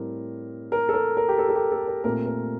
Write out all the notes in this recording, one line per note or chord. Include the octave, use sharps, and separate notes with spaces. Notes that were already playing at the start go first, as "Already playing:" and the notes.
Already playing: A2 G3 C4 A#4
A#4
A4
A#4
A#4
G4
A4
A4
G4
A4
A#4
A#2 A3 C4 A#4
A#4